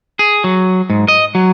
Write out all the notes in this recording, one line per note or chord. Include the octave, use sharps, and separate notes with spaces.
G#4
F#3
G#2
D#5
F#3